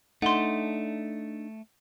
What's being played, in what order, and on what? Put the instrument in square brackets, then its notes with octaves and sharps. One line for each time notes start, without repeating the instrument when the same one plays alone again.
[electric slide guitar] A3 [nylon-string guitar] D4 D#4 [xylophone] F#5 C6